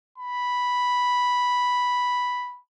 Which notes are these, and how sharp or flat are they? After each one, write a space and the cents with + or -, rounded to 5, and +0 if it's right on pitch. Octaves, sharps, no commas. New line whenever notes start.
B5 -5